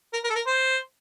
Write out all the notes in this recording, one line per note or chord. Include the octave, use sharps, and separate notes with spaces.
A#4
A#4
A4
A#4
C5